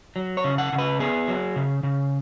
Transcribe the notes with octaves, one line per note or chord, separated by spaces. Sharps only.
F#3
C#5
C#3
F#5
C#3
B4
B3 G#4
F#3
C#3
C#3